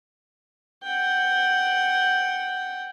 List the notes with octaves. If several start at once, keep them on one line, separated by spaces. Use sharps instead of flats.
F#5 G5